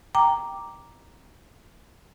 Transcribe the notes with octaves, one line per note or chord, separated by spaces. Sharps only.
G5 A#5 D6